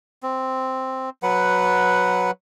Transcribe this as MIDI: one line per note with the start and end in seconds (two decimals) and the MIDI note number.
0.23 1.10 60
1.23 2.31 54
1.23 2.31 71
1.23 2.31 78